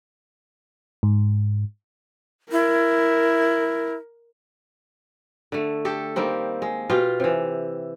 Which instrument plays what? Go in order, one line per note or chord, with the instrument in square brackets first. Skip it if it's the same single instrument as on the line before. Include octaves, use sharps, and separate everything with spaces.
[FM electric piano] G#2
[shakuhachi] E4 [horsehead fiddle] A#4
[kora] D3 A3
G4 A4
D#3 G3 A#3 C4
G#3
B2 F4 G4 F5
C3 E3